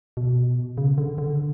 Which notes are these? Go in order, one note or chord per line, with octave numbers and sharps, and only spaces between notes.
B2
C#3
D3
D3